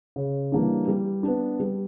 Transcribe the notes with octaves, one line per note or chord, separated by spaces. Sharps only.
C#3
E3 G3 A#3 D4
G3
B3 D4
G3